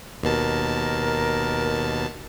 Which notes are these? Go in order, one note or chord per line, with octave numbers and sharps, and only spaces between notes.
D#2 B2 A#4 A5